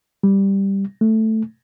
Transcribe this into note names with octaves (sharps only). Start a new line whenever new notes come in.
G3
A3